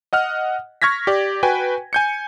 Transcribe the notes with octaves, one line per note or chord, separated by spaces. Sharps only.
D#5 F#5 F6
C#6 F6 G#6 A#6 B6
G4 D5
F#4 B4 G5 G#5
G#5 G6 C#7